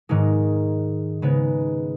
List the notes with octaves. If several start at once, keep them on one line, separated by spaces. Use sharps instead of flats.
G#2 D#3 G#3 D#4
C#3 G#3 B3 D#4